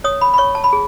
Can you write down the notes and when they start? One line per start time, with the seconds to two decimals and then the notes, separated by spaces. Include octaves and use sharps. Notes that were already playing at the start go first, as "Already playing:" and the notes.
0.04 C#5 D#6
0.21 B5
0.34 B5
0.38 C#5 C#6
0.55 A5
0.64 B5
0.73 G#4